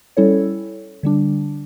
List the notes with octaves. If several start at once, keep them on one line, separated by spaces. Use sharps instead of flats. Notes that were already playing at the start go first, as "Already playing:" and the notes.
G3 C#4 E4 A4 C#5
D3 G3 D4